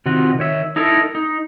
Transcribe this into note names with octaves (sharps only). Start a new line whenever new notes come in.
C3 D#3 F4 F#4
D#3 C#5 E5
D#4 E4 A4 A#4
D#4